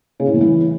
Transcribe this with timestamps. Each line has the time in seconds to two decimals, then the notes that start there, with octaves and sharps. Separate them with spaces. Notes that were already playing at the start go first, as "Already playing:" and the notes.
0.20 C#3
0.27 A2
0.34 E2
0.41 E3